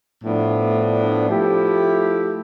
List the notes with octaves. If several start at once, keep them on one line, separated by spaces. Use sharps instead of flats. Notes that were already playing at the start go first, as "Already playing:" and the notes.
A2 F3 B3 D4
F3 A3 E4 G4